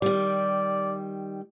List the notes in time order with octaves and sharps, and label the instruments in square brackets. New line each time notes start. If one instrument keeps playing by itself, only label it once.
[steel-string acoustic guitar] D#3 G3 [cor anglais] D5